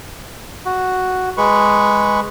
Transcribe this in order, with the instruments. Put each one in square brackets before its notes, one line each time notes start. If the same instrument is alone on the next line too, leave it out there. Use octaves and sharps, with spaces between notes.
[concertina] F#4
G#3 B4 C#6